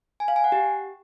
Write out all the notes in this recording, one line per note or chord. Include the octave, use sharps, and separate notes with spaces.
G#5
F5
G#5
F#5
G4